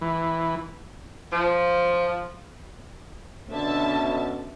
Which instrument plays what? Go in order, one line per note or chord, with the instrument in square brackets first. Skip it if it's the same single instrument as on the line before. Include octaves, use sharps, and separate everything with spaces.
[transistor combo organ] E3
[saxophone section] F3
[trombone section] B2 C#4 [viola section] D3 E5 A5